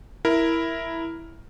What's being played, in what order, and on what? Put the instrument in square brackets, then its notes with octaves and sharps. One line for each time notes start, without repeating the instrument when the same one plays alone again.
[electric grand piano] E4 A#4